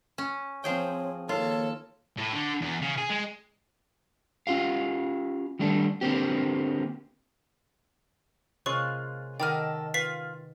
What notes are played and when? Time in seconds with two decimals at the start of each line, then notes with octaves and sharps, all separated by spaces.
0.18 C#4
0.64 F3 C4 G#4 C#5 G5
1.29 D#3 A#3 F4 A4 C#5
2.18 A2
2.33 D3
2.61 E2
2.82 C#3
2.98 G#4
3.10 G#3
4.47 C#4 F4 G4 F5
5.59 D#3 G3 A3 D4
6.01 D3 A#3 C4 G4
8.66 C3 G#3 A#3 C#4 F4 C6 C#6 F#6
9.40 D#3 A4 A#4 D#5 F#5 G5 D6 F6
9.94 F4 B4 B6 C7